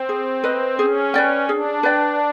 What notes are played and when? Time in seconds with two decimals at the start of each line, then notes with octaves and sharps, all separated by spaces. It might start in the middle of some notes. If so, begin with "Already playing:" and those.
Already playing: C4
0.09 G#4
0.44 B4 D#5
0.78 C#4 G#4
1.14 B4 D5 G5
1.49 D4 G#4
1.83 B4 D5 G5